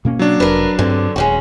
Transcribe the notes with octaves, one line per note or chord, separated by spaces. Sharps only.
B2 A#3 C#4
F#3 D4
F1 A#4 B4
G2 D3 C4
D#1 G#3 C#4 F#4